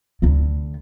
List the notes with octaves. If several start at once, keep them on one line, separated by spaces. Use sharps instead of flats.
D2 D3